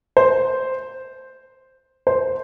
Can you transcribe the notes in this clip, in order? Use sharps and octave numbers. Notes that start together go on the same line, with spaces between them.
C5
C5